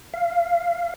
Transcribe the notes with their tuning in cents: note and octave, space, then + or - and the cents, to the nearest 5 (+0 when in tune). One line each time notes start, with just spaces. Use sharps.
F5 -20